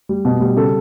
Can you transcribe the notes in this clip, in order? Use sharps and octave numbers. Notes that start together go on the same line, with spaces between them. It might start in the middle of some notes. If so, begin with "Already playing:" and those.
G3
B2
G3
C#3 A4